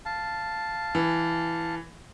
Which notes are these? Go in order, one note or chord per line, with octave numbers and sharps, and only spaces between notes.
F5 A5
E3